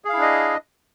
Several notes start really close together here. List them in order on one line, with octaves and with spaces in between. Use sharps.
G#4 F5 E4 D4 D#5